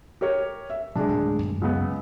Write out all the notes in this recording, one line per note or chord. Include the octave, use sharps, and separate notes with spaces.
G4 A#4 C#5
E5
G2 C3 F#3 G#3 D4
D1 D#3 A3
F#2
C#2 B3